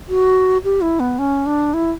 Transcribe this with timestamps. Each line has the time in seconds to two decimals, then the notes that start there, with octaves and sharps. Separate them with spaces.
0.08 F#4
0.64 G4
0.81 E4
1.00 B3
1.19 C#4
1.46 D4
1.74 E4